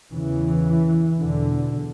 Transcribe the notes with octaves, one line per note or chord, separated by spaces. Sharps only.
E2 C#3 E3
E2 B2 D3